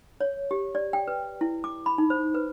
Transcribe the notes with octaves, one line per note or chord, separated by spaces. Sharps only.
C#5
G4
D5
G5
B4
E4
D6
B5
D#4
C5
B4